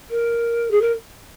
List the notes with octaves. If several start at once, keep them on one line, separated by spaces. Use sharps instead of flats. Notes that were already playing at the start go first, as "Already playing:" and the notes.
A#4
G#4
A#4